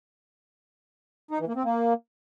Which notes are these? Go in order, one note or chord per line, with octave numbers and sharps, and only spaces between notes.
D#4
E3
A#3
C4
A#3